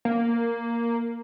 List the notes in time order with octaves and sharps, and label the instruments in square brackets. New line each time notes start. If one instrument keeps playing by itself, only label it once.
[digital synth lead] A#3